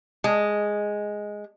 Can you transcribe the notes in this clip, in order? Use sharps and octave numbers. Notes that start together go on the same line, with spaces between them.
G#3